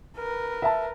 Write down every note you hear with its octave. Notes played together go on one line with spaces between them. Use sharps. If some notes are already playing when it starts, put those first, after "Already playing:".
A#4 B4
E5 A5